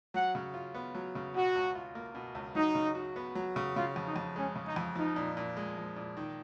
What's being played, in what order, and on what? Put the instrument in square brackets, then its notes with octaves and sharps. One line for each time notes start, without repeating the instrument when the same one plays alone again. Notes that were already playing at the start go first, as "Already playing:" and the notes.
[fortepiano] F#3 [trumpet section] F#5
[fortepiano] C#3
F4
B3
F#3
C#3
[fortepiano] B2 [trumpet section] F#4
[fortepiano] C#2
F4
A#3
B2
C#2
[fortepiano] F#3 [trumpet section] D#4
[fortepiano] C#3
F#4
B3
F#3
C#3
[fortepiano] C#3 [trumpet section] F4
[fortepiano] F2
[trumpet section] D#4
[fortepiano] F2
[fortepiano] G#3 [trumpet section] C#4
[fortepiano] C#3
[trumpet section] D#4
[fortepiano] F2
[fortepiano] F3 [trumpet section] D#4
[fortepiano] A#2
A#2
G#3
F3
A#2
D#3